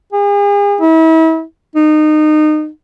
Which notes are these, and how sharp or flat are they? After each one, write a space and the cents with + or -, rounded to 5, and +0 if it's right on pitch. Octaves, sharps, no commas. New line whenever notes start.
G#4 -40
E4 -35
D#4 -25